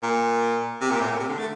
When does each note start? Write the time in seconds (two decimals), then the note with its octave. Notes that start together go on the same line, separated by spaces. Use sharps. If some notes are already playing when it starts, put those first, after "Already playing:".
0.03 A#2
0.81 C3
0.91 A#2
1.00 A2
1.10 A#2
1.20 C3
1.29 D3
1.39 A3